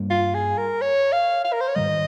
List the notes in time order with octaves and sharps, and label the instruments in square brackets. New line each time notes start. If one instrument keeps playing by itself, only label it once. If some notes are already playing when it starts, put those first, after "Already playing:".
Already playing: [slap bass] G2 G3 A#3 C#4
[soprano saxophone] F4
G#4
A#4
C#5
F5
F5
A#4
C5
C#5
[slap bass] G#2 D#3 G3 [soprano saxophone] D#5